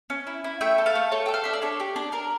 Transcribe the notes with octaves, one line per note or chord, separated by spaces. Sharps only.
C#4
E4
E4
A3 E5 G5
A4
F5 A5
A3
A3 A4 C#5
G5
A4
F5
D4 E5
D5
D4 A4 C#5
G4
D4
D4 A#4